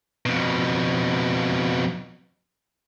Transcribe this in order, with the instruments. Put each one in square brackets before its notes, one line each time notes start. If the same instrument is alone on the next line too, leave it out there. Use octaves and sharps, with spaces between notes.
[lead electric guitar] F2 B2